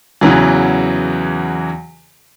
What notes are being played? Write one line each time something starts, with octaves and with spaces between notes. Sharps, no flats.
E2 C#3 E3 F#3